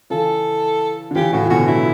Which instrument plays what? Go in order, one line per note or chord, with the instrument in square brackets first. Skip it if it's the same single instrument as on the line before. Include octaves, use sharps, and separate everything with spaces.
[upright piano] C#3 E3 [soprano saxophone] A4
[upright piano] D3
[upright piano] C#3 E3 [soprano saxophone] G4
[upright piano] A2 C#3 [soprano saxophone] F#4
[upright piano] E3
[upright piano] B2 D3 [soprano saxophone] F#4
[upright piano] D3 F#3 [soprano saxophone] E4